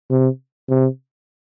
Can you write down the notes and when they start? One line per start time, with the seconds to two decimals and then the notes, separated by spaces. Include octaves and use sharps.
0.11 C3
0.69 C3